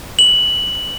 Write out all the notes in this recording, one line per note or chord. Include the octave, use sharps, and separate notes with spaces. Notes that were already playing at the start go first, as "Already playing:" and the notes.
F#7